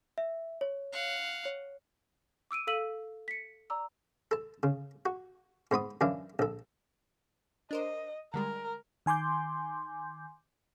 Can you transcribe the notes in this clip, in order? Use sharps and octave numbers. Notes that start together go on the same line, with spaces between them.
E5
C#5
F5 F#5
C#5
D6 E6 D7 D#7
A4 F5 E6 B6 D#7 F#7
B6 C#7
D5 A#5 D6 E6
A4 A5
C#3
F#4
G#2 B3 B5 D#6
F#2 E3 D4 F5
A#1 A4
D4 A#4 C5 D#5
D3 G3 G#3 A#4
D#3 G#5 C6 D6 G6